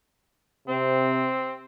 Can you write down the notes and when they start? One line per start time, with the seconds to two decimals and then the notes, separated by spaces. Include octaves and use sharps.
0.68 C3 C4